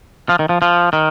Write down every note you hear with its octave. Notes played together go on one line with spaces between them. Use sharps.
F3
D#3
F3
F3
D#3